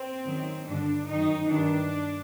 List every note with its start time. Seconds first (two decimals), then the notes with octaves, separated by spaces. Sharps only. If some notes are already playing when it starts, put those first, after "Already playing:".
Already playing: C4
0.26 F#2 D#3
0.68 G2 D3 D4
1.09 F#2 D#3 D#4
1.51 G2 D#3 D4